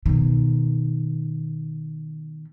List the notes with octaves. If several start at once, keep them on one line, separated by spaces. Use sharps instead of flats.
B2 D#3